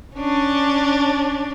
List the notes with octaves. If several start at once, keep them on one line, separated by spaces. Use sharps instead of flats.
C#4 D4